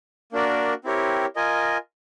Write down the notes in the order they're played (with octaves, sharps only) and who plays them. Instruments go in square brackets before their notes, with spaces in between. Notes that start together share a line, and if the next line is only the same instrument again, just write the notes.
[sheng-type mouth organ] A#3 D4 F#4 A#4 D5
C4 E4 G4 A#4 C#5
F4 A#4 D#5 G#5